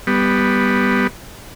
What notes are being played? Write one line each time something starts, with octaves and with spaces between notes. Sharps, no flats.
G3 B3